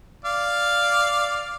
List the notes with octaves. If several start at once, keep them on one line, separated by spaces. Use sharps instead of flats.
D5 F5